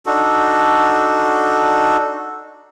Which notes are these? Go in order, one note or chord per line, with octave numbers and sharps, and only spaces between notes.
D4 D#4 F#4 A4